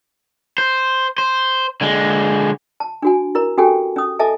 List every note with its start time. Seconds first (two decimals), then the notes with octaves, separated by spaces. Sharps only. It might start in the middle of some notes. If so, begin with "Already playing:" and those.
0.58 C5
1.18 C5
1.81 D3 G#3
2.80 A5
3.02 D4 F#4 G#5
3.35 E4 A#4 A#5
3.58 C#4 F#4 G4 A4 G5 G#5
3.96 C#4 D#6
4.19 A4 D#5 E5 G#5 A5